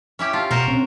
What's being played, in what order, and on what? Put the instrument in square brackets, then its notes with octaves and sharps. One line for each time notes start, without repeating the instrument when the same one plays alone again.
[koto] C#4 E4 G4
[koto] F4 [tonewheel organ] A5
[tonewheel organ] B2 [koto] F#4 A#4 C5
[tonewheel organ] C4 C#4